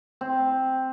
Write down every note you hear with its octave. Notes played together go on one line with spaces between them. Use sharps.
C4